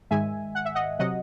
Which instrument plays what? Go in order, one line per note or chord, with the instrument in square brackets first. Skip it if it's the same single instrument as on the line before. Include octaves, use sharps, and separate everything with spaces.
[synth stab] G#2 D#3 G#3 E5 G#5
F#5
E5
D#5 F#5
C3 F#3 D#5 F#5